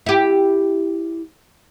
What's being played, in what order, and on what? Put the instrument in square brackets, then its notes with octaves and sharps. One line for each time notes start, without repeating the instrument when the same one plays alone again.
[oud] E4 G4